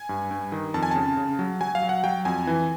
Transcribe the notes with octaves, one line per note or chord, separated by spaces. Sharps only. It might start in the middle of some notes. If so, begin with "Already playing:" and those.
Already playing: G#5
G2
G2
D#3
F2 A5
G#5
C#3 A5
C#3
F#3
F#3 G#5
F5
F#3
F#5
F#3 G5
F2 G#5
E3